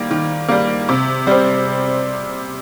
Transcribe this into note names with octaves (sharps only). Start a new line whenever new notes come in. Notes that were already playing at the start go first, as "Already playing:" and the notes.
Already playing: D#3 G3 A#3
D#3
G3 A#3
C3
G3 C4